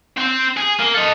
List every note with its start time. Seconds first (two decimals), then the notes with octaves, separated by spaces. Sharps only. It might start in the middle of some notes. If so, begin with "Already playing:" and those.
0.17 C4 G5
0.57 G#4
0.79 A#3
0.94 A4 D#5